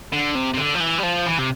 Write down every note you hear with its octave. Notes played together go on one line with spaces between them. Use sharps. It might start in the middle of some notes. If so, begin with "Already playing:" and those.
D3
C3
C3
D3
F3
E3
G3
F3
E3
C3